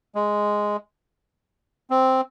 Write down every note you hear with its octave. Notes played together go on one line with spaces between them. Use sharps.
G#3
C4